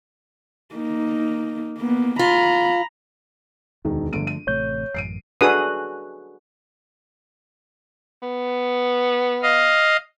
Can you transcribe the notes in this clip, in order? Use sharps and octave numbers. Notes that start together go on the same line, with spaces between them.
A#3 D#4
A#3 B3
F4 A#5 B5
E1 D2 D#3
G1 D3 F3 A3 D7 D#7
D#7
A1 C3 A3 C#5 G6
A1 F#2 C7 D7 D#7
D4 F#4 G#4 A4 B4 D#6
B3
D#5 F5